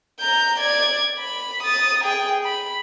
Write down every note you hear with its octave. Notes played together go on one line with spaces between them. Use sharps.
A#5 G6
D5 G#6
B5
D#6 A6
G#4 G5
B5